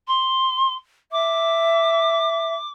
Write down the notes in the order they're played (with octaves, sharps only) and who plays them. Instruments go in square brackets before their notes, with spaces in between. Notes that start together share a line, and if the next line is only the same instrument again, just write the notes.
[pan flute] C6
[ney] E5 [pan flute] D6